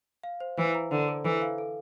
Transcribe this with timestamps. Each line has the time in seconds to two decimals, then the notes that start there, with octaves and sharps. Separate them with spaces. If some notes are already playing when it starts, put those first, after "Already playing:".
0.23 F5
0.40 C5
0.58 E3 C5
0.75 A#5
0.91 D3 C5
1.08 A4
1.25 E3 A4
1.42 F5
1.58 A4